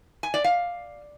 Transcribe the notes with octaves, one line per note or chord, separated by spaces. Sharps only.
G#5
D5
F5